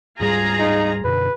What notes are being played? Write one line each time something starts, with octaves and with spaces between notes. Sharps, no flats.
D1 G#2 G3 F4 G#4 A#5
D#4
F#2 B2 D3 B4